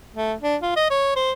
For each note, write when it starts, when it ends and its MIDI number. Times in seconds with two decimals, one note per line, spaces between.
0.15 0.33 57
0.42 0.56 62
0.62 0.73 65
0.76 0.85 75
0.90 1.15 73
1.16 1.32 72